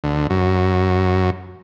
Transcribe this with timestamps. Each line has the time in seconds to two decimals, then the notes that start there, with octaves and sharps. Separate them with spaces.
0.04 D2
0.30 F#2